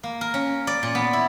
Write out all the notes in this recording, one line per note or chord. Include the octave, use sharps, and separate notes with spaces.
A#3
A#4
C#4
D5
A#2
B3
E4